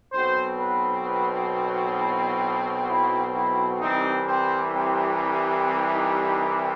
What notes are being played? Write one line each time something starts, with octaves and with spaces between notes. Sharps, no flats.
B1 B2 F#3 C4 C5
B4
B4
F#4
E4
E4
E4
C2 C3 E3 G3 C4 D#4
C4
C4
C4
D#4
D#4